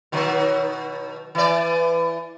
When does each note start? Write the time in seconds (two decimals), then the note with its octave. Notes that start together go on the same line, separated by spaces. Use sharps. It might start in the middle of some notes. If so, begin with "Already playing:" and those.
0.12 B2 D#3 F#3
1.35 E3 D5